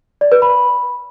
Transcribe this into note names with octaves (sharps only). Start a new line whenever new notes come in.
D5
B4
B5